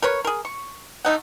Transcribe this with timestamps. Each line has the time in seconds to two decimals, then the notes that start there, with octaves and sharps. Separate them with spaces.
0.02 A#4 B4 C#5
0.25 G#4 A#4
0.45 C#6
1.05 A3 D#4 F#5